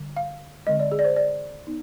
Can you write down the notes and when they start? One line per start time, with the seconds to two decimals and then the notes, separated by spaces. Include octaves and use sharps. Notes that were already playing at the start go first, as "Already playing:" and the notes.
Already playing: D3 G3
0.17 F5
0.67 D3 G#3 C4 D#5
0.79 D5
0.92 G#4
0.99 D5
1.05 C5
1.16 D5
1.67 B3 D#4